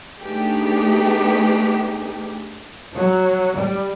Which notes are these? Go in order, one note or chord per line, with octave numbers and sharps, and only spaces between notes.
A3 B3 D4 D#4 G4 G#4
F#3
G3